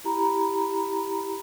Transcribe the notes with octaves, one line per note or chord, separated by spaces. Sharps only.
E4 G4 A#5 B5